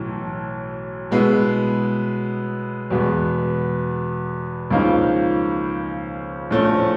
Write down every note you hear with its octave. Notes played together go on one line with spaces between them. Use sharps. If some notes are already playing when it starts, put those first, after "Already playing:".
Already playing: B1 A2 E3
B2 G#3 B3 E4
E2 B2 G#3 B3
C#2 C#3 F3 A#3 D#4
A#1 A2 F3 A3 C#4